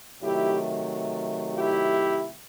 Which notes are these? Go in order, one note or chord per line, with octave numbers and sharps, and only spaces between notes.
C3 D#3 F#3 A3 E4 G4
E4 G4